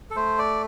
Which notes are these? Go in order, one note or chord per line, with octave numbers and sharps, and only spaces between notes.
A4
A3 C5
D5